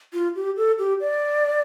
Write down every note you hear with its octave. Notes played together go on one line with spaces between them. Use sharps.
F4
G4
A4
G4
D5